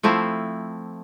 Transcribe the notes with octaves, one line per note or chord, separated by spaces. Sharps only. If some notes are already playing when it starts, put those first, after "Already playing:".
F3 A3 C4 E4